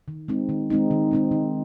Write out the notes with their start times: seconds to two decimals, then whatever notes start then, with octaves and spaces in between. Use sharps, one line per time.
0.08 D#3
0.28 G#3 C4 D#4
0.49 D#3
0.70 G#3 C4 D#4
0.91 D#3
1.11 G#3 C4 D#4
1.31 D#3